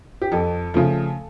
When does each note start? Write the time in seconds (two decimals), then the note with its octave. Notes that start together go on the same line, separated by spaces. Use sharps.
0.22 G4
0.32 F2 A4
0.74 C#3 F3 A3